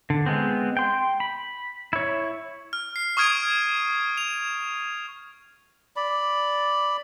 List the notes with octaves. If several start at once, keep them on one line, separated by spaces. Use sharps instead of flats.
D3
G#3 B3 C4
G5 C6
B5
E4 C#5
F6
C7
C#6 D#6 F6 G#6 D7 D#7
F7
D5 B5